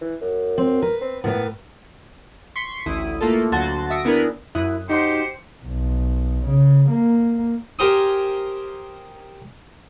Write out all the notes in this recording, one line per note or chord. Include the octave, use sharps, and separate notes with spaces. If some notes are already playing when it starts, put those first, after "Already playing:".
E3
F#2
C4
A#4 B4
C4
A2 B3 A#4 B4
C6 C#6 B6
A1 D2 E4 D#6
A3 A#3 F4 A4
D2 F#3 F#4 A5 C6 A6
E5 D#6 E6 A#6 C#7 D7
B3 D4 E4 G#4 A#4
F#2 E4 D#6 F#6
D#4 F#4 G4 C5 C6 C#7
B1
C#3
A#3
G4 A#4 C5 G#5 C6 D#6